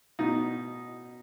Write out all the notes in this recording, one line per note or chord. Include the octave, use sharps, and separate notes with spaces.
B2 D#4